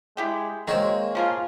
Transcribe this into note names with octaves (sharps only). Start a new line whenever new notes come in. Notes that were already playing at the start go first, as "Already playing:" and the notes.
G#3 E4 G4 G5
D#3 G#3 A#3 C4 F#4 C#5
F3 A#3 F4 G#4